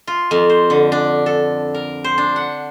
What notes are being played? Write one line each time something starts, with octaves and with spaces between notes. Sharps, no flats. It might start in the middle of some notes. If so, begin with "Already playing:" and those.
F4
F2
C5
D3
D4
A4
A#4
C5
D4
F#5